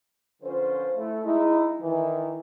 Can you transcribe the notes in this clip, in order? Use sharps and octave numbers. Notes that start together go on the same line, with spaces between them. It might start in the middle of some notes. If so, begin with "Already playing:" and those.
D3 F3 C#4 F4 B4 C5
A3 E4
G#3 D#4 E4
D#3 E3